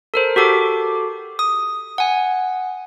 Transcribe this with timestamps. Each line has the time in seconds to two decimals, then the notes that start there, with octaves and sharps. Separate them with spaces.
0.14 A4 A#4 C5
0.36 F#4 G4 A4 D6
1.39 D#6
1.98 F#5 G#5